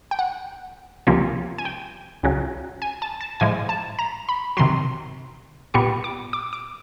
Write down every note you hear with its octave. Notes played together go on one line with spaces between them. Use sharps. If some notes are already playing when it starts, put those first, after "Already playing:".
G5
F#5
C#2 C3 F3 A#3 C#4
G#5
G5
C#2 C#3 F#3
G#5
A5
A5
A2 F3 G#3 G#5
A5
A#5
B5
C3 D#3 F#3 C6
A#2 G3 B3 C#6
D6
D6
D6